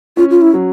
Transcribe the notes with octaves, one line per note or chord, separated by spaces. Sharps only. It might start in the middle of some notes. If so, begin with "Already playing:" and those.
C#4 F4
F4
E4
F#3